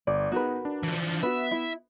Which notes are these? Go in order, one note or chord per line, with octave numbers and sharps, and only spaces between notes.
G1 D5
B3 D#4 F#4 G#4 A#4 B4
D4
E3 F3
B3 F#4 B4 E5
E4